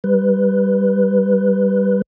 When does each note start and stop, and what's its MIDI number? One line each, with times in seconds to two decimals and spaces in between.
0.04 2.02 55
0.04 2.02 71